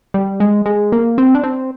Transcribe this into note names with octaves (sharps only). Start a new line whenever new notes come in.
G3
G#3
G#3
A#3
C4
D4
C4